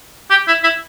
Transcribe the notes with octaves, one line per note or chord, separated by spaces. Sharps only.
G4
E4
E4